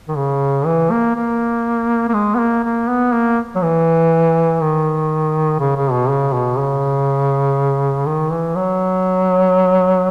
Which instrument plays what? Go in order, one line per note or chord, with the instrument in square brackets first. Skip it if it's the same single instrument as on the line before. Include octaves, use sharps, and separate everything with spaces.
[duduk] D#3
C#3
E3
A#3
A#3
A#3
G#3
B3
A#3
A#3
B3
A#3
F#3
E3
D#3
C#3
C#3
B2
C#3
B2
C#3
D#3
E3
F#3